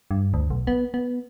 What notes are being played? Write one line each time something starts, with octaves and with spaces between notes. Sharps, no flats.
G2
D2
B1
B3
B3